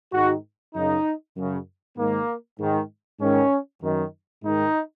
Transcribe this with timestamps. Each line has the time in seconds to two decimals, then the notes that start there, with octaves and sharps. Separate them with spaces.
0.13 G#2 D#3 F#4
0.75 F#2 C#3 D#4
1.36 F#2 C#3
1.98 G#2 D#3 A#3
2.59 G#2 D#3
3.20 G#2 D#3 C#4
3.82 F#2 D#3
4.43 G#2 D#3 D#4